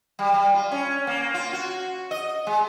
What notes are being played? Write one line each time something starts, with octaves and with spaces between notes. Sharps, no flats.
G3
G3
F4
C#4
A#3
F4
F#4
D#5
G#3